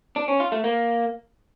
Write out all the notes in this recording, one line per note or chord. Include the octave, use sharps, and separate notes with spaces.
D4
C#4
F4
A3
A#3